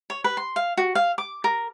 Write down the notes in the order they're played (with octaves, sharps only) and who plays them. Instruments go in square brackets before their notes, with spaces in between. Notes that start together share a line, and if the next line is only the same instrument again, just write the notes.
[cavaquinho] C#5
B4
C6
F5
F#4
F5
D6
A#4